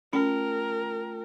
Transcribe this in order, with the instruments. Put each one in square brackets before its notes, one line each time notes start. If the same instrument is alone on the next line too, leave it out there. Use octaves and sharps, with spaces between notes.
[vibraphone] A3 F4 G5 [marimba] C#4 [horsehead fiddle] A#4